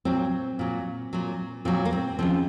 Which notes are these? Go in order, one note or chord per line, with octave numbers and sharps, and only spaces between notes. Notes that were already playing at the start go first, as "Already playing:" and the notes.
A#2 F#3 C4
A#2 F#3
A#2 F#3
A#2 F#3 C4
A#3
C4
D#2 C#3 F3 C4